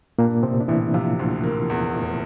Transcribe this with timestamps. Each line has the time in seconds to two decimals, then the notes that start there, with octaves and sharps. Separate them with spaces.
0.19 G2 A#2 A#3
0.43 A1 C3 C4
0.61 D4
0.68 A1 E3 E4
0.94 C3 F3 F4
1.19 D2
1.43 A#3
1.70 E2
1.94 F1